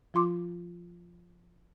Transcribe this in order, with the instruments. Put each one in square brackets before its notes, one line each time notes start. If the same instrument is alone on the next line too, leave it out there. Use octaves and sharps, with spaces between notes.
[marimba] F3 F4 C6 D6